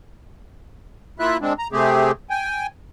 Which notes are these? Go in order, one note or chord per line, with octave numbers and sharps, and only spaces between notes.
A#3 E4 F4 E5 F#6
G#3 C4 D4
A#5
C3 A3 C4 G4 G#4
G5 G#5